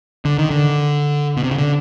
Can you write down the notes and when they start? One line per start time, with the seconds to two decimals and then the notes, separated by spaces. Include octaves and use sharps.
0.25 D3
0.39 D#3
0.50 D3
1.37 B2
1.44 C3
1.51 C#3
1.58 D3